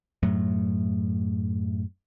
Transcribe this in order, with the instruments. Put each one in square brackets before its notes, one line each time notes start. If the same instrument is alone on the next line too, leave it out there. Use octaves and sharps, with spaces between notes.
[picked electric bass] F#2 A2 F#3 A3